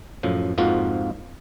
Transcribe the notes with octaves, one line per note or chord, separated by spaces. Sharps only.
F#2 A2 F3
F2 G#2 F3 A#3 F4 F#4